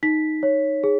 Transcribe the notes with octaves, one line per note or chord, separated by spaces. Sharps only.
D#4 B6
C#5
G#4